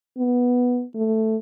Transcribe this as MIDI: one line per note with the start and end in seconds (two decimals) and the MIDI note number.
0.18 0.84 59
0.95 1.36 57